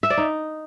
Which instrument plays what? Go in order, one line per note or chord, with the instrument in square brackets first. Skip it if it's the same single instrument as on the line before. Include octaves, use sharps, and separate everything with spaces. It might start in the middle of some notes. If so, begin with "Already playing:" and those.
[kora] E5
D5
D#4